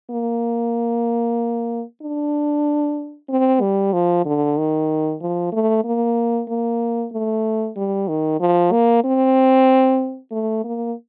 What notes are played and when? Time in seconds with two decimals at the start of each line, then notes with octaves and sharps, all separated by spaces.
0.10 A#3
2.02 D4
3.29 C4
3.61 G3
3.93 F3
4.26 D3
4.57 D#3
5.21 F3
5.52 A3
5.84 A#3
6.49 A#3
7.12 A3
7.76 G3
8.08 D#3
8.40 F3
8.72 A#3
9.04 C4
10.31 A3
10.64 A#3